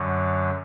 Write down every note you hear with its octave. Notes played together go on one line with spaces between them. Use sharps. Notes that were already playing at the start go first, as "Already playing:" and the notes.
Already playing: F#2 D3 F#3